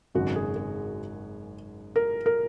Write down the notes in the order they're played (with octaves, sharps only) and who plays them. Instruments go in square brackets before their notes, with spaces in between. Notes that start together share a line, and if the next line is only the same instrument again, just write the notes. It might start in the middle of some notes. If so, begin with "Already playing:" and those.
[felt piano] G#1 F#2 C#3 F#4
G#4
G#4
A#4
A#4